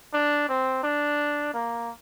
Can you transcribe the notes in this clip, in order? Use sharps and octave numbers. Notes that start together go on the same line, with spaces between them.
D4
C4
D4
A#3